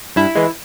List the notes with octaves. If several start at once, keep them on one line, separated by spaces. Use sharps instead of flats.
G2 E4
E3 G#3